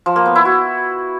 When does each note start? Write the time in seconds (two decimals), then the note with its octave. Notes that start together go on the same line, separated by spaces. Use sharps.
0.06 F3
0.16 A#3
0.26 B3
0.35 E4
0.45 F#4